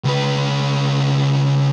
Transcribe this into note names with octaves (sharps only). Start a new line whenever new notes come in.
C#2 B4